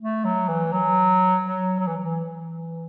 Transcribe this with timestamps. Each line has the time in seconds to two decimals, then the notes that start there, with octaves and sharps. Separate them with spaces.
0.01 A3
0.25 F#3
0.48 E3
0.72 F#3
1.44 F#3
1.79 F#3
1.87 E3
2.00 E3